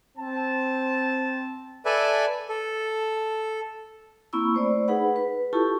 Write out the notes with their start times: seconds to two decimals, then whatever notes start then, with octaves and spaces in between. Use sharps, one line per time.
0.18 C4 A5
1.85 A4 B4 D5 E5 G#5
2.49 A4
4.33 A#3 C4 E4 B5 C#6 E6
4.54 A3 C5 D5
4.88 D#4 G#4 B4 F#5 B5
5.16 B4
5.53 E4 F4 G4 A4 A5 C#6